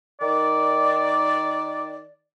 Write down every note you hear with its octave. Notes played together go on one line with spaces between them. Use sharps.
D#3 D5